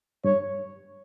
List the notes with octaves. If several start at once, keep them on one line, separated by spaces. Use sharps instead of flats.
G2 C#5